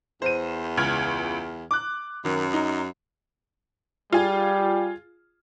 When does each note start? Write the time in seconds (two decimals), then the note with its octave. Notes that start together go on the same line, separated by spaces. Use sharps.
0.22 E2 C5 D#7
0.77 C#2 F6 G#6
1.71 D6 F#6
2.25 F#2 D#3
2.54 D#4
4.13 G3 F4 G#4